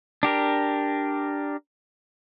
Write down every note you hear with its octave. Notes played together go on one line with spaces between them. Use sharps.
D4 G4 A#4